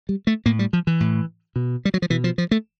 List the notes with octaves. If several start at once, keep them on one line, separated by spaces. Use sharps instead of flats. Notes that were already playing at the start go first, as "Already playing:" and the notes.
G3
A3
A2 A#3
G3
F3
E3
A2
B2
G3
F#3
F3
B2 E3
F3
F3
A3